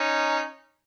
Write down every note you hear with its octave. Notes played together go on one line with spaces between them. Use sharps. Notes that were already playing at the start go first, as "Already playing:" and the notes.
Already playing: C#4 D#4